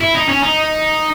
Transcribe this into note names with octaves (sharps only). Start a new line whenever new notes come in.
E4
D#4
C#4
D#4